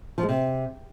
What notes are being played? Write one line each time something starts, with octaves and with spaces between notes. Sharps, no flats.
F3
G#3
C3